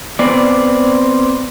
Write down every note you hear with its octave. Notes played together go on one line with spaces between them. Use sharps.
B3 C4 D5